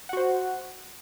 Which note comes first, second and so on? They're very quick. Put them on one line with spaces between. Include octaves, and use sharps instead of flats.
F#5 F#4 C5